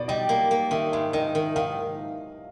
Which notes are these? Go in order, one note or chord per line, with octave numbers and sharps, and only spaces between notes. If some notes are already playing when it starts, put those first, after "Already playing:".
Already playing: B2 D5
G3 D#5
A#3
A#3
D#3 E5
G#2 E5
D#3 D#5
D#3
D#3 F5